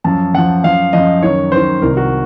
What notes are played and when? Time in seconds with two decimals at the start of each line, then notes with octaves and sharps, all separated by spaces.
0.04 F#2 F3 A5
0.34 F#2 F3 F#5
0.64 F#2 F3 F5
0.93 F#2 F3 D#5
1.23 F#2 D#3 C#5
1.52 F#2 D#3 C5
1.81 C2 C3 D#3 A#4
1.97 F#4